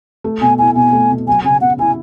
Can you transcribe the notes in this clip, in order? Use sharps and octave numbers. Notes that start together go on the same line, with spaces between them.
A3
B2 G#5
E4 G#5
B2 G#5
A3
B2
F#3 G#5
C#3 G#5
B3 F#5
E4 G#5